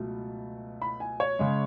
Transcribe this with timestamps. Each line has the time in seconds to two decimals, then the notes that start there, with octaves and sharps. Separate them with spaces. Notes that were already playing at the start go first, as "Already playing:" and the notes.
Already playing: C#2 B2 F#3 A3
0.82 B5
1.00 G#5
1.20 C#5
1.39 C#3 G#3